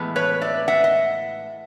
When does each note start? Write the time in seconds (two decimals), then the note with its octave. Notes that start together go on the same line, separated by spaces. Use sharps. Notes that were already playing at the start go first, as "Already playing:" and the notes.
Already playing: A2 E3 G#3 B3
0.16 B4 C#5
0.41 D5 E5
0.68 E5 F#5
0.84 D#5